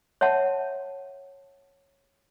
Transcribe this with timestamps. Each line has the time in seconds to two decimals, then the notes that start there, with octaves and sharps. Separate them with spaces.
0.21 C#5 E5 F#5 A5